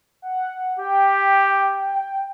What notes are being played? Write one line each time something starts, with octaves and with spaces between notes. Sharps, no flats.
F#5
G4 G5